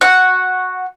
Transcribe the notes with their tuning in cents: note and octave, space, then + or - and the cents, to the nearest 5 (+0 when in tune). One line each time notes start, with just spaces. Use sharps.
F#4 -10 F#5 +0